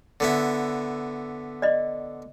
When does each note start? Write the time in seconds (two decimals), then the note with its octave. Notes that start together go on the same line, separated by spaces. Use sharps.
0.20 D3 B3 E4
1.62 D5 D#5